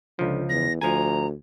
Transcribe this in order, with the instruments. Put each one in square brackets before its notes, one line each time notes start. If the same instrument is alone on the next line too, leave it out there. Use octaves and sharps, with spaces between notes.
[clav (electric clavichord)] C#2 F3 [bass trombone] D3
[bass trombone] E2 [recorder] A#6
[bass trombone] D2 [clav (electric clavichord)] F3 G#5 [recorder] A#5